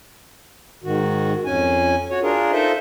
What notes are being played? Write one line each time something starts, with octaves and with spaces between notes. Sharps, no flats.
G#2 D#3 F#4
F2 C#4 G#5
F#4 C#5
D4 F4 G#4 A#4
D#4 F4 A4 C5 D#5 E5